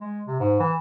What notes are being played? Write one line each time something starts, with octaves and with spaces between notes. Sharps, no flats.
G#3
C3
G#2
E3